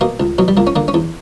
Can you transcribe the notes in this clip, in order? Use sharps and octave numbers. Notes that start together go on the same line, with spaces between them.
B2 A#3
C#2
B2 F#3
G3
C#2 A#3
C#4
D3 A#3
C#4
E2